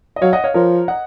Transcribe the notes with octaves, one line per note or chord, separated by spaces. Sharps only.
D#5
F#3 C#5 F5
D#5 F#5
C#5 F5
F3 A#4 C#5
D#5 F#5